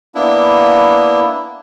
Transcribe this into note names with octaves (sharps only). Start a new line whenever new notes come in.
A#3 B3 D4 E4